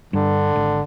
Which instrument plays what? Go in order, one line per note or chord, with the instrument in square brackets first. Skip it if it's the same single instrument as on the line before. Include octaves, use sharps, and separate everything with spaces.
[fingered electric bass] G2 [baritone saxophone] D3
[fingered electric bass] G#1